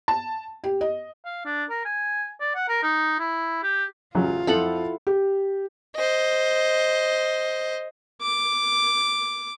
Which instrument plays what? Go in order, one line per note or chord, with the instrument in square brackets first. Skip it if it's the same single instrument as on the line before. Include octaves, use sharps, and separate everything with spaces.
[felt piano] A5
G4
D#5
[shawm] F5
D4
A#4
G#5
D5
F#5
A#4
D#4
E4
G4
[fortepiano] A1 C#3 F#3 [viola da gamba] F4
[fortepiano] F2 F3 C4 [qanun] E4 A4 F#5
[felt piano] G4
[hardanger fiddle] C5 D#5
[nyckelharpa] D6